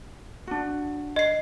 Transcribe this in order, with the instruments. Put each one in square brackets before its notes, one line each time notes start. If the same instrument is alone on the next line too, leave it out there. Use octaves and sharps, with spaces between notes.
[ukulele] D4 F#4
[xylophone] D#5 C7